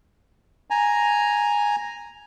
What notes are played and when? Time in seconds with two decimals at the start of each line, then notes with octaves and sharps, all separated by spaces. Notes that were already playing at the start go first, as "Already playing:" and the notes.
0.70 G#5 A#5